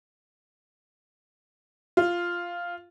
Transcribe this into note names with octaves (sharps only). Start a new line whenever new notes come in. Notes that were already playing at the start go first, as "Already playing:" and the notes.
F4